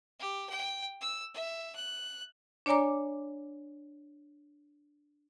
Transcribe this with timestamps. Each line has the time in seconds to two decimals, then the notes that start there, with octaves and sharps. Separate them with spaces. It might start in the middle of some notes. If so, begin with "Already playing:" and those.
0.19 G4
0.49 G5
1.01 E6
1.34 E5
1.75 F#6
2.66 D4 C#5 D5 G#5 A#5 D6